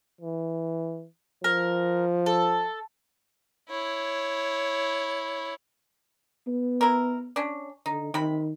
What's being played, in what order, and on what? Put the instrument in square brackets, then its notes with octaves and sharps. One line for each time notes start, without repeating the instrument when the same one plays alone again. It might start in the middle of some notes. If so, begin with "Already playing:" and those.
[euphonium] E3
[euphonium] F3 [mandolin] A#4
[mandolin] A4
[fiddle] E4 C#5
[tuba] B3
[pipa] E4 A#4
C#4 D4
[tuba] D3 [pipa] D#4
[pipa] C3 B5 [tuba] D#3